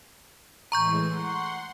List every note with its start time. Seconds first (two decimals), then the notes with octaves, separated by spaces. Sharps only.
0.72 A2 E3 G#3 A#5 C#6 G6
1.08 F#5 C6